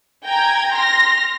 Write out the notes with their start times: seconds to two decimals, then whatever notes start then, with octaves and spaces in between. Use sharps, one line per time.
0.24 G5 G#5 A#5 G#6
0.74 C6 F6 A#6